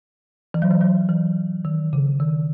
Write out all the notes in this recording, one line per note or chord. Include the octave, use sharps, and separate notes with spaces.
E3
F#3
E3
F#3
E3
D#3
C#3
D#3